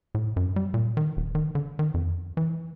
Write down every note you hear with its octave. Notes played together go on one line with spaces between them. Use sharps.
A2
F#2
G3
A#2
D#3
D#1
D#3
D3
D#3
F2
E3